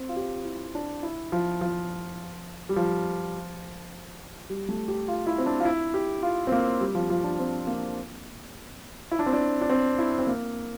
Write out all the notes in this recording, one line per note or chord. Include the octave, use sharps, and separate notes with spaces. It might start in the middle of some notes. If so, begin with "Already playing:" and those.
Already playing: C4
F4
G4
E4
D4
E4
F3
F3
G3
F3
G3
A3
G4
F4
E4
C4
D4
F4
E4
G4
F4
C4
A#3
G3
F3
F3
D4
C4
A#3
E4
D4
C4
D4
D4
C4
E4
C4
A#3